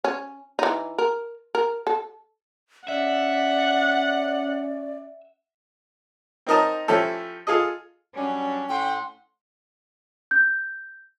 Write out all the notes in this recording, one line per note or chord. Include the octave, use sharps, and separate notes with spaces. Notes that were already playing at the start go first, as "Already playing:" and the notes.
C#4
E3 D#4
A#4
A#4
A4
C#4 D5 E5 F#5
C4 D#4 A#4 D#5 A5
F3 A3 C#4 E4 G4 A4
F4 G#4 A4 D#5
F#3 G3 C#4 D4
A2 F#5 G5 C6
G6